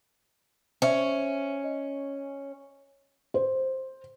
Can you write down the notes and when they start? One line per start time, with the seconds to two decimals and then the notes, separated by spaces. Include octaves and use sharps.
0.82 C#4 C5 E5
1.64 D#5
3.34 C5